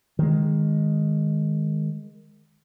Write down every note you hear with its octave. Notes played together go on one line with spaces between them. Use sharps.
D#3 G#3